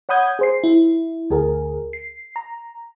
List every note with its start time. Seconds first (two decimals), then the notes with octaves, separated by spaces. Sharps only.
0.09 C#5 F#5 B5 D#6 G6 G#6
0.39 G#4 C5 C7
0.64 E4
1.30 D2 G#4 A#4
1.93 C7
2.36 A#5